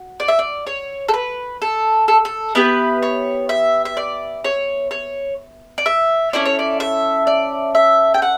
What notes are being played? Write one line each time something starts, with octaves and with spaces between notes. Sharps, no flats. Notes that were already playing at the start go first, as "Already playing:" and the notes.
Already playing: F#4
D5
E5
D5
C#5
A4
B4
A4
A4
A4
B3 E4 G4 B4
C#5
E5
E5
D5
C#5
C#5
D5
E5
C#4 E4 A4 D5
C#5
D5
E5
D5
E5
G5
F#5